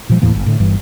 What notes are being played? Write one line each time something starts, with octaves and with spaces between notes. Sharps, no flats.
A#2 F3 G#3
D#2 A2 E3 A#3
G1
A2 D3
G1 G2 E3